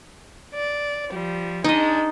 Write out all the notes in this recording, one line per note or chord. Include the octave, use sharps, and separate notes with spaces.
D5
F3 G3
G#3 D4 D#4 D#5